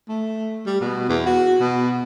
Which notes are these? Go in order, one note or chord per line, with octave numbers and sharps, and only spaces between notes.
A3
G3
B2
E2
F#4
B2